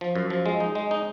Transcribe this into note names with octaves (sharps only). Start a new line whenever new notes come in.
F3
F#2
F3
G#3
D#4
G#3
D#4